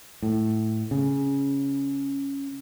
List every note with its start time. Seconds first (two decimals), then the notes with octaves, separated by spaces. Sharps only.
0.22 A2
0.91 C#3